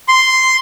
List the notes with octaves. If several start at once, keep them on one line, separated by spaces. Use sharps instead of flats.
C6